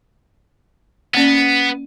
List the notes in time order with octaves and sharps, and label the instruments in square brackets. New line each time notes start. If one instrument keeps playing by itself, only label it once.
[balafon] A#3 C#4 D5 [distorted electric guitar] B3